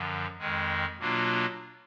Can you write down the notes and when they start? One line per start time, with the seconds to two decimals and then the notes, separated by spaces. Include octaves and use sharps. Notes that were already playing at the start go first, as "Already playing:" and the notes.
Already playing: F#2 D3 F3
0.38 F2 D#3 G#3
0.98 B2 F#3 A#3 D4 F4